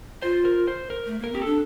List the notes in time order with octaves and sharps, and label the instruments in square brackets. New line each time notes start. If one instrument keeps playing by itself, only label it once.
[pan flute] F4 [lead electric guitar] C5
[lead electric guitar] A#4
C5
A#4
[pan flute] A3
[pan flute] A#3 [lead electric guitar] A#4
[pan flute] C4 [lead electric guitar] G4
[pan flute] D4 [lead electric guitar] A4